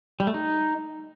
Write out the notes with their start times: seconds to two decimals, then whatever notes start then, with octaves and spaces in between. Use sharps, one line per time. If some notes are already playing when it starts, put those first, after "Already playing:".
0.20 G3
0.27 A3
0.34 D#4